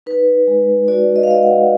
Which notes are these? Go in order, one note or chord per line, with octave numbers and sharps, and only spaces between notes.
D#4 B4
G#3
F#4 D5
D#5
F5
G#3 D#5
F#5